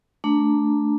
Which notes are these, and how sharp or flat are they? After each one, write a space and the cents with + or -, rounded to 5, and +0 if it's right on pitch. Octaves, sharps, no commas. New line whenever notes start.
A3 +0 D4 +0 A#5 -5